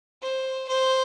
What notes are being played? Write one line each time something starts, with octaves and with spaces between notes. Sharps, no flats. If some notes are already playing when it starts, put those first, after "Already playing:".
C5
C5